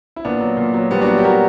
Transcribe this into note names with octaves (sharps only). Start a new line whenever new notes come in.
E4
A#2 B3 D4
F#3
A#2
F#3
A#2 G3 B3
D4 F#4
F#3
G4
A#2 F#4 A#4